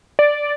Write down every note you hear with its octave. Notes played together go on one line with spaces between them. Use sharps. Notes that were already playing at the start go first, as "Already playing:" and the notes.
D5